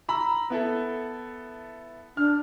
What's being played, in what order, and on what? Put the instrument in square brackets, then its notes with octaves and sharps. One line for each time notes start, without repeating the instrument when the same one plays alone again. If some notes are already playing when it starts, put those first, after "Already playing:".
[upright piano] A#5 B5 E6
B3 E4 A4
[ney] D4 [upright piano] F6